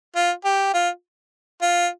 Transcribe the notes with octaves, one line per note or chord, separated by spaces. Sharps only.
F4
G4
F4
F4